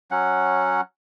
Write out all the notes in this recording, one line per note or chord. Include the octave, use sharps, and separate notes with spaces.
F#3 C#4 F#5